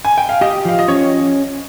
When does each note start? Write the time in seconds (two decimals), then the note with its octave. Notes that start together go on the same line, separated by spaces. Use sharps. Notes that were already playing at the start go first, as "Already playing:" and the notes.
0.05 G#5
0.18 G5
0.29 F5
0.41 G4 D#5
0.65 F3 F5
0.79 D#5
0.88 C#4 C#5